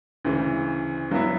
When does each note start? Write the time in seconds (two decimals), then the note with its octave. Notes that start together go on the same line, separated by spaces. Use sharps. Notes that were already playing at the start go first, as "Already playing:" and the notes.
0.25 D2 C#3 E3
1.11 G2 F#3 B3 E4